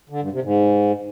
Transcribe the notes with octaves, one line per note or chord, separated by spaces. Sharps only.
D3
G2
C3
G#2